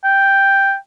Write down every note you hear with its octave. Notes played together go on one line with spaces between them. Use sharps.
G5